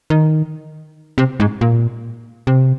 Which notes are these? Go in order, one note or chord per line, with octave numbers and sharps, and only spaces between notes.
D#3
C3
G#2
A#2
C3